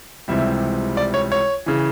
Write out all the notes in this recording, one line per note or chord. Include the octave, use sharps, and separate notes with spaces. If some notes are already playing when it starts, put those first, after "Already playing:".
C#2 C3 E3 G3 C4 E5
D5
C#5
C#5
C#3 E3